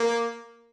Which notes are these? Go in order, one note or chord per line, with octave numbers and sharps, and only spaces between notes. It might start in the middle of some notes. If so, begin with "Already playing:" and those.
Already playing: A#3